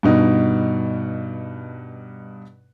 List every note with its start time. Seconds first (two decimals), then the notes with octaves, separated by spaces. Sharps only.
0.03 G2 B2 D#4